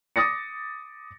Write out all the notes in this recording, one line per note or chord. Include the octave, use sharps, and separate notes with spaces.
D6 D#6 A6 A#6 C#7